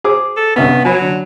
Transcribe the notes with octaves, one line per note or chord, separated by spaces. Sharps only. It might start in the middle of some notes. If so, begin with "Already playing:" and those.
G#4 C5 D6
A4
G2 C3 B3 C#4
F#3 G#5 B5
D3